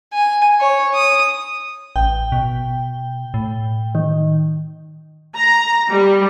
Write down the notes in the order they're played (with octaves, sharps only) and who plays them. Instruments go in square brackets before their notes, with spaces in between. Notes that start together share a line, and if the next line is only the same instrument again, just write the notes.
[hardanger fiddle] G#5
C#5
D#6
[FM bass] A1 [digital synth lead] G5
[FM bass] B2
A2
[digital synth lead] D#3
[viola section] A#5
G3